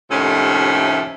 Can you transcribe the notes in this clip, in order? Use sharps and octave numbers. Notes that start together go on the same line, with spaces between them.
D#2 A2 C3 F3 A3 C#4